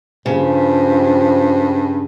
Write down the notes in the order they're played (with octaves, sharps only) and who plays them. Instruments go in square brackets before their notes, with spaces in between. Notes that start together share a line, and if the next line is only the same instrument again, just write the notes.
[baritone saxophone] G2 [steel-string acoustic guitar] C#3 [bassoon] F3